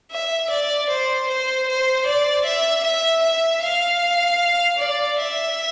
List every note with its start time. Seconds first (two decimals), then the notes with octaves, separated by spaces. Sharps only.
0.11 E5
0.50 D5
0.89 C5
1.29 C5
1.68 C5
2.06 D5
2.45 E5
2.84 E5
3.23 E5
3.63 F5
4.78 D5
5.18 E5